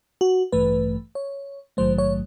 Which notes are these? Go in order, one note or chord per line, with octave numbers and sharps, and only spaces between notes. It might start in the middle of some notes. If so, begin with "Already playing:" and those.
F#4
A1 G2 E3 A3 B4
C#5
A#1 G#2 D#3 F#3 A3 C5
C#5